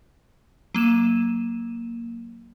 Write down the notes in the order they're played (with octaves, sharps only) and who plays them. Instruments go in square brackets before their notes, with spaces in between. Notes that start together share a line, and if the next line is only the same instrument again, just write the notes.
[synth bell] F#3 A#3 D#7 E7